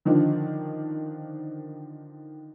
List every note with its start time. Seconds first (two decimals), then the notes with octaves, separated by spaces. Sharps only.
0.05 D3 D#3 F3 D4